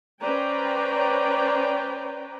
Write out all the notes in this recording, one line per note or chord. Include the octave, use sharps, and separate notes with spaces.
C#4 B4 C5 D5 G5 A#5